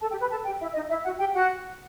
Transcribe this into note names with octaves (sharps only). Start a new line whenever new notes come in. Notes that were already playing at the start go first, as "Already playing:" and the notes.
A4 A5
G4 G5
B4 B5
A4 A5
G4 G5
E4 E5
D#4 D#5
E4 E5
F#4 F#5
G4 G5
F#4 F#5